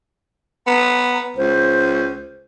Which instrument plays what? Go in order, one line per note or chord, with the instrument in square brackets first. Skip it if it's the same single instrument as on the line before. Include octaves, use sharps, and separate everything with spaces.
[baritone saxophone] B3 [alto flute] A#5
[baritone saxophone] C#2 [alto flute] C5